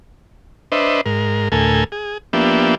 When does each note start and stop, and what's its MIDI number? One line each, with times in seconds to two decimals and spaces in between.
0.72 1.01 62
0.72 1.01 71
0.72 1.01 72
0.72 1.01 75
0.72 1.01 76
1.06 1.48 44
1.06 1.48 70
1.52 1.84 38
1.52 1.84 45
1.52 1.84 69
1.52 1.84 70
1.52 1.84 80
1.92 2.18 68
2.33 2.75 53
2.33 2.75 58
2.33 2.75 59
2.33 2.75 62
2.33 2.75 67
2.33 2.75 76